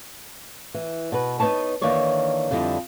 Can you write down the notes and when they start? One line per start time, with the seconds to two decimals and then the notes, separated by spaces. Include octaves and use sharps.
0.74 E3
1.12 B2 B4
1.40 B3 D#4 B4 C#5 A5
1.82 D#3 E3 A#3 D4 C#5 D5
2.51 F2 D3 G3 E4 D#5